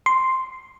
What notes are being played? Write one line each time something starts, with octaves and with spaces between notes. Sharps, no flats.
C6